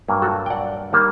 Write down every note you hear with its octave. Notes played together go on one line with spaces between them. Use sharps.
G2 F#3 A#3
F#4 A4
G5
D5 F#5
D#3 G3 A#3